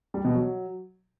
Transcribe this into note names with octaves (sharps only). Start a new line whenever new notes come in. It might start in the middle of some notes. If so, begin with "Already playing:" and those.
G3
B2
F#3